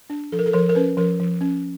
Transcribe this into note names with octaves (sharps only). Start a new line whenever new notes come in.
D4
F3 A4
A#4
A4
F3 A#4
A#4
C#4 B4
F3 A#4
F3
C#4